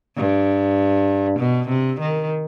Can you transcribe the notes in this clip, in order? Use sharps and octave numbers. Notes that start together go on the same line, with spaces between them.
G2
B2
C3
D#3